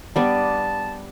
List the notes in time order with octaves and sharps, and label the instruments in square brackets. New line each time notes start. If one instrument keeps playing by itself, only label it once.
[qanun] G3 B3 D4 [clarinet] A5